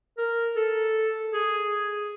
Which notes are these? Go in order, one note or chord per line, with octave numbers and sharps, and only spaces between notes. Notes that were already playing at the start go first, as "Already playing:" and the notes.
A#4
A4
G#4